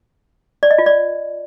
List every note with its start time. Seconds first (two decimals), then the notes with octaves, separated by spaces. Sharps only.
0.63 D5
0.71 D#5
0.78 F4
0.86 D5